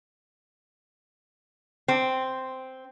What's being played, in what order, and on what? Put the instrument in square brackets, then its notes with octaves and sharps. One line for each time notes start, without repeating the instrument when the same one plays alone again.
[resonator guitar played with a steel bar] C4